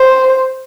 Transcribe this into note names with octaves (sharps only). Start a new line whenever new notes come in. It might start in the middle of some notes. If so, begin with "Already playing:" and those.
Already playing: C5